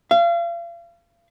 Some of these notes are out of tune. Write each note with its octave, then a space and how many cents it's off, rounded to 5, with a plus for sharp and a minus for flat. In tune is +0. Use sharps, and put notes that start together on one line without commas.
F5 -35